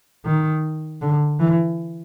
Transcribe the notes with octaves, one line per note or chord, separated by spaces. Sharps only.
D#3
D3
E3